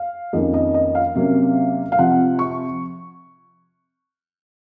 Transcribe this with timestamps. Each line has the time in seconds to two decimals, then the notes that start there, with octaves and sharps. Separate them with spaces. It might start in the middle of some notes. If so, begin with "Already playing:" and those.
Already playing: F5
0.33 F2 D#3 A#3 C#4 D#5
0.54 D#5
0.74 D#5
0.95 F5
1.15 C3 F#3 A#3 C#4
1.92 F5
1.98 C3 F3 C4 F#5
2.39 C#6